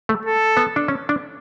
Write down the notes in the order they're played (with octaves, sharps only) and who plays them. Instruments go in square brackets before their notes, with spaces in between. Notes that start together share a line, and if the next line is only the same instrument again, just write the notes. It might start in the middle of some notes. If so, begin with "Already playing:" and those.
[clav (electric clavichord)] A3
[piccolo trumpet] A4
[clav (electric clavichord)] B3
D4
C#4
D4